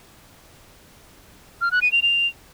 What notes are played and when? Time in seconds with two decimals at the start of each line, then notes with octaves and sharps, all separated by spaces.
1.61 F6
1.71 F#6
1.82 D#7
1.92 F7
2.02 F7